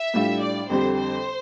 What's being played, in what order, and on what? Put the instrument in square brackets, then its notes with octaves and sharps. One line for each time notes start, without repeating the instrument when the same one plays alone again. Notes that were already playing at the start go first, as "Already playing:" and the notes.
Already playing: [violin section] E5
[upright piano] A2 G3 D4 F4
[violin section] D5
[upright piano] F2 D3 G3 C4 G4 [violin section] C5
[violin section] C5